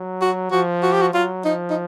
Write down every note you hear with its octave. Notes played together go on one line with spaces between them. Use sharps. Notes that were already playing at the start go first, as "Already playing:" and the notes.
Already playing: F#3
F#4
F3 F#4
F#4
G4
F#4
F#3 F4
F3 D#4
D#4